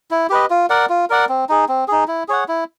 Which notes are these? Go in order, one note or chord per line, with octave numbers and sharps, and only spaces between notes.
E4
G4 B4 D#5
F4
A#4 D5 F#5
F4
A#4 D5 F#5
C4
D#4 G#4
C4
D#4 G#4
E4
G#4 C#5 F#5
E4